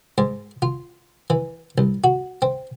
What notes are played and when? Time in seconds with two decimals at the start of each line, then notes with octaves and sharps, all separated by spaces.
0.18 G#2
0.62 F4
1.30 E3
1.78 C2
2.04 F#4
2.42 C4